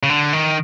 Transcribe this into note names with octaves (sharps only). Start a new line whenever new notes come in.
C#3
D3
D#3